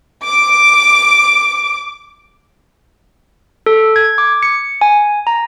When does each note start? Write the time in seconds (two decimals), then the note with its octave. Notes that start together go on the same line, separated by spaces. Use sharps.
0.24 D6 D7
3.66 A4
3.96 G#6
4.18 D6
4.43 C#7
4.81 G#5
5.27 A#5